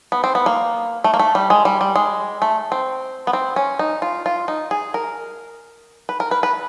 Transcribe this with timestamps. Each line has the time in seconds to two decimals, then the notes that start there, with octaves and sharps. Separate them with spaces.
0.12 B3
0.24 C4
0.35 B3
0.46 A#3
1.04 A3
1.14 A#3
1.19 A3
1.35 G3
1.50 G#3
1.65 G3
1.81 G3
1.96 G#3
2.42 A3
2.72 C4
3.27 B3
3.33 C4
3.56 C#4
3.79 D#4
4.02 F4
4.26 F4
4.48 D#4
4.71 G#4
4.94 A#4
6.09 B4
6.20 A#4
6.31 B4
6.43 B4